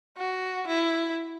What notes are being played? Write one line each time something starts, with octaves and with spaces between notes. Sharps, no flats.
F#4
E4